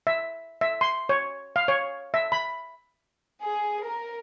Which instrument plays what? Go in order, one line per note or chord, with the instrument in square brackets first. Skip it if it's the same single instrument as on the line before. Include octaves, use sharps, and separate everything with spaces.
[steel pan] E5
E5
C6
C#5
F5
C#5
E5
B5
[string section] G#4
A#4